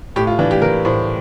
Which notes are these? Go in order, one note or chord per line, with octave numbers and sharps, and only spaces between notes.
A2 G4
F4
E3 D4
G4
E3 A#4
A2 C5